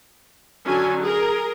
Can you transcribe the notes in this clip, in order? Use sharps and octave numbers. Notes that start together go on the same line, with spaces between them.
D3 F#3 C#4 G#5
G#4 A#4